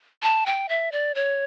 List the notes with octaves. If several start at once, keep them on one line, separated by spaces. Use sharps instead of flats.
A5
G5
E5
D5
C#5